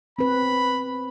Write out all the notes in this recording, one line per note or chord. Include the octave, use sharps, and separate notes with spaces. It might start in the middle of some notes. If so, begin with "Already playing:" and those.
C4 B4 B5